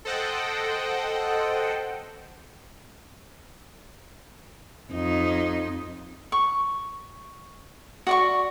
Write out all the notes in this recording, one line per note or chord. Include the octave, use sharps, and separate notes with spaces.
A4 C5 D#5 F#5 G5
F2 D#4
C#6
F#4 D5 C#6